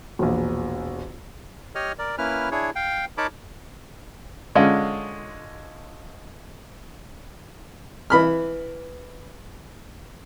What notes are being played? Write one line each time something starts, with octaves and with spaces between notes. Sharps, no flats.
E1 A#1
G4 C#5 D#5 F6
A#4 D5
A#3 C#4 E4 B4 F6
D4 E4 G#4 C#5
F5 G5
D#4 A#4 C#5 A5 B5 D6
D3 G#3 C#4 F4
E3 B5 F6